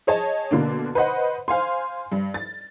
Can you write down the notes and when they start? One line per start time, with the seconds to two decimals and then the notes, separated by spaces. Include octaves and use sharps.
0.07 G#4 C#5 D#5 A5
0.51 B2 D3 A#3 D4
0.95 B4 C5 D#5 F#5
1.48 C5 F5 G#5 C6
2.12 G2
2.34 A6